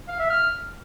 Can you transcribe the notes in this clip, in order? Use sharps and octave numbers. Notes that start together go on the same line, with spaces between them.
F5
E5
F6